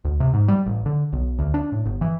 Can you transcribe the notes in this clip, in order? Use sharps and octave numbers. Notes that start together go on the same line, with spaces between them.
D2
C3
G#2
G3
A1
D3
B1
D2
D4
A2
G1
E3